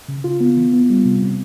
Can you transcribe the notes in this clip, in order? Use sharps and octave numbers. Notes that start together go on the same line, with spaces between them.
C#3
C#3 F4
B3
E3
B3
G3
C3
C3